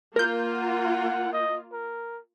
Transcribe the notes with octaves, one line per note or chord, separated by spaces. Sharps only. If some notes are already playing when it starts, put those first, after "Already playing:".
A#3 F4 A#4 G6
F#5
D#5
A#4